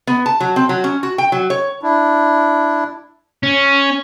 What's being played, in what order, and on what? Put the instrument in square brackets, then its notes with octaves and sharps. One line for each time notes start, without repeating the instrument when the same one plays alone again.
[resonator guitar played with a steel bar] B3
A5
F#3
C4
F#3
C#4
F#4
G5
F#3
C#5
[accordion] D4 E4
[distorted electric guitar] C#4